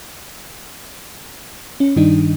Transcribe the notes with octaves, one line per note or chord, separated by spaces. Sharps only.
C#4
G2 D#3 G3 D4 D#4